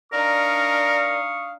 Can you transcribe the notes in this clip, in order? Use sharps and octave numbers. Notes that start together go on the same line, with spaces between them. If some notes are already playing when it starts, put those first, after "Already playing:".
D4 D#4 A#4 D5 F5 C#6 D#6